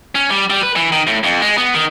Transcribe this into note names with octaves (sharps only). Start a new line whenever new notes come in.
C#4
G3
G3
B4
E3
D#3
A2
F2
G#3
B3
D#3